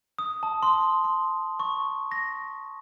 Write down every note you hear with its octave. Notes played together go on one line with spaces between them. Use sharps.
D#6
A5
C6
C6
C#6
A#6